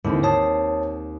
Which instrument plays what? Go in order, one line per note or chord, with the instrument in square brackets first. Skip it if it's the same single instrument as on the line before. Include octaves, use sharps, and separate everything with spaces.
[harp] D#2 C4 [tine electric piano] G#2 D3 E4
[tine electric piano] C#5 A5 D#6 [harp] C7